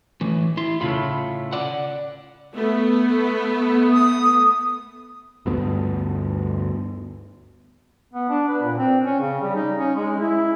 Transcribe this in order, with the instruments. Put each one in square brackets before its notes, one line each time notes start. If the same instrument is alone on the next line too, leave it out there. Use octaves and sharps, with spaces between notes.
[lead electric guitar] A2 E3
E4 C6
[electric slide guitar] A2 C#3 A3 [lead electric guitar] F4 B5
[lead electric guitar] D5 F#5
[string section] A3 B3
[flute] D#6
[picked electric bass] D2 G2 B3
[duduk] B3
D4
B4
A#2
C4
C#4
C#3
G3
D#4
C#4
G#3
E4